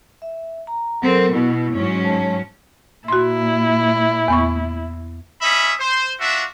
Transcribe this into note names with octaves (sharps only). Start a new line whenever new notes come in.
E5
A#5
F#3 C4 A4 A#4
B2 E4
G#2 F#3 C#4
C#5 A5
A#2 E4 F#4 C6
E2 B3 C#6
C#4 D#5 E5 B5 D#6
C5
D4 F4 F#4 E5